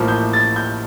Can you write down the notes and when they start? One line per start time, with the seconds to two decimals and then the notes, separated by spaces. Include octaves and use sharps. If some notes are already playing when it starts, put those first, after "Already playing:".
Already playing: A1 A2 F3 A#3
0.08 G6
0.33 A6
0.56 G6